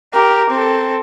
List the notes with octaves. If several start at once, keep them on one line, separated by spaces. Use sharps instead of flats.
G4 A#4
C4 A4